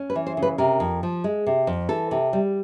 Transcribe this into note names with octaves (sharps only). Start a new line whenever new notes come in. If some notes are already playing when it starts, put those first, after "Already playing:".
Already playing: C#4
B4
E3
C5
C#3
B4
C3 A#4
F2
F3
G#3
C3
F2
E3 A4
C3
G3